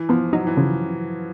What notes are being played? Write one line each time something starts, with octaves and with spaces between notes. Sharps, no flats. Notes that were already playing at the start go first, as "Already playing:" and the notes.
Already playing: E3
F3 B3
F#3 D#4
E3
C#3 F3